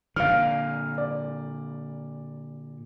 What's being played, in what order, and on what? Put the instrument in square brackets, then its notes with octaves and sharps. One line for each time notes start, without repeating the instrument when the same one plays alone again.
[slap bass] A#2 D3 [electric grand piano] F5 F6
[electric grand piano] D5